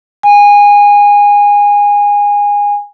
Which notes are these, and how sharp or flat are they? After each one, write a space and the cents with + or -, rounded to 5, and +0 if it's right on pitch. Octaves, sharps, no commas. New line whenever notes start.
G#5 -20